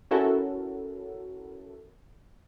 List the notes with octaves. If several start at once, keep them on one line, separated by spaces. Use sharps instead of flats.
C#4 E4 F#4 A4 A#4